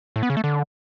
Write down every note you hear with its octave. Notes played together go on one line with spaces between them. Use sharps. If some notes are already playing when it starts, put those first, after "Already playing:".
A2
B3
C#3
A3
D3